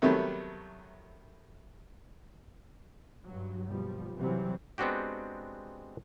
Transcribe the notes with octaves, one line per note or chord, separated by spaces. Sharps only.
C3 D#3 F#3 G3 A3 B3
G2 F#3
D#2 B2 F3 G3
C3 E3 F#3 G3 C4
G#3 B3 C4 D4 F#4 G4